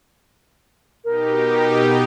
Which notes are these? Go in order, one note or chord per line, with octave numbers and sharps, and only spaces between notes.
B2 D#4 G4 A#4